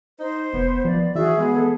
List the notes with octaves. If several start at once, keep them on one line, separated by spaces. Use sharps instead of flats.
D#4 C5
F1 B3
F3 D5
E3 F#4 G#4 E5
G#3 B3
A4